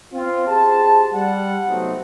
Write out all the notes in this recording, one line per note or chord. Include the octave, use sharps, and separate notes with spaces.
C4 F4
G4 G#4 C5 A5
G3 F#5
C3 F#3 A3 B3 C4 D#4